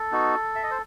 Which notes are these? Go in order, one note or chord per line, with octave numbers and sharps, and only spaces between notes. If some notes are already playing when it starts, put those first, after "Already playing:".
Already playing: A4
B3 D#4 F#4
E5
D#5
C5